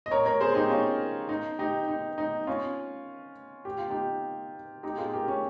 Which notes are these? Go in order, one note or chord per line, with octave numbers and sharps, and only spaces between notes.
D#5
A#4 C#5
A#4 C#5
G#4 C5
D#4 G4
C#4 F4
D#4
D#4 G4
D#4
D#4
C#4 F4
G4
F4
D#4 G4
D#4 G4
F4 G#4
G4 A#4
C#4